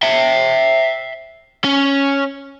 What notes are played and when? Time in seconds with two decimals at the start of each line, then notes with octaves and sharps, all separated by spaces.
0.03 E5 G5
1.65 C#4